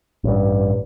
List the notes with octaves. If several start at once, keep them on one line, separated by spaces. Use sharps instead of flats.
A1 G2